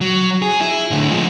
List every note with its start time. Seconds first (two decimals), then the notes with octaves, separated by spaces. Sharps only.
0.01 F#3
0.42 G#4
0.61 E4
0.91 A2 D3
1.09 F3 G#3